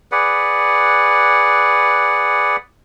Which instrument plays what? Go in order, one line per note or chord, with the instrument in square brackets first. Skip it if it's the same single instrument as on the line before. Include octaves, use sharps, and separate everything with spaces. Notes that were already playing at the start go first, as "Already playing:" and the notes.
[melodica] G#4 B4 D5 F#5